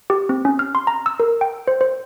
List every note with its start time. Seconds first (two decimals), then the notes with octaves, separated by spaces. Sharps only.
0.10 G4
0.29 C4
0.45 C#4
0.59 F6
0.75 C6
0.87 A#5
1.06 E6
1.20 A#4
1.41 G5
1.68 C5
1.81 C5